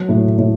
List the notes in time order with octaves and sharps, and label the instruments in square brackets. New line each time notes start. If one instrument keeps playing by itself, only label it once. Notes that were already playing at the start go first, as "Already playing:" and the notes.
Already playing: [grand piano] F#3
A2
A2